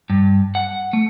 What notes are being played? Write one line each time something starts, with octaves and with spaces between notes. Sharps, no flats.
G2
F#5
A3